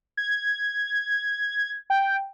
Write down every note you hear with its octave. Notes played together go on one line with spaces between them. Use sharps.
G#6
G5